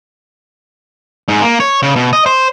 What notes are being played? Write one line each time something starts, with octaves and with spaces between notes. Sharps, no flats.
G#2
A#3
C#5
C#3
B2
D#5
C5